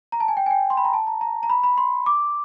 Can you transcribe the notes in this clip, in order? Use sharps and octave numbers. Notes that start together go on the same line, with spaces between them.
A#5
A5
G#5
G5
G#5
G5
C6
B5
A#5
A5
A#5
A#5
A#5
B5
B5
C6
D6